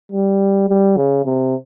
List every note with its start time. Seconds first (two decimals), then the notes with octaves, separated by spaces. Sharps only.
0.12 G3
0.69 G3
0.97 C#3
1.25 C3